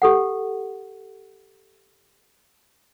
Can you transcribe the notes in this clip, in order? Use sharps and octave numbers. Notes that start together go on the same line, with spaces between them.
G4 A4 F#5